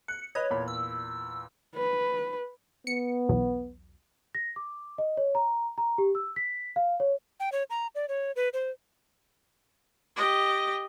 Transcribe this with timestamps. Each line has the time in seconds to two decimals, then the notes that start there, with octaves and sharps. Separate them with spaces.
0.08 F#6 C#7
0.35 B4 C#5 D#5
0.50 E2 A#2 B5
0.68 E6
1.76 B4
2.87 B3 C#7
3.29 B1 E2 F#3
4.35 A#6
4.56 D6
4.98 D#5
5.17 C#5
5.35 A#5
5.78 A#5
5.98 G4
6.15 E6
6.36 B6
6.76 F5
7.00 C#5
7.40 G5
7.52 C#5
7.70 A#5
7.95 D5
8.09 C#5
8.36 B4
8.53 C5
10.16 G4 D#5